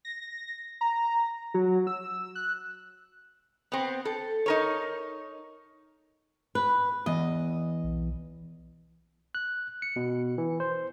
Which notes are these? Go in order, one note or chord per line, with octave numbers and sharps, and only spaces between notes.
A#6
A#5
F#3
E6
F#6
B3 C4
A4
D#4 A#4 C#5
B4
E2 D#5
B1
F#6
C#7
B2
E3
C5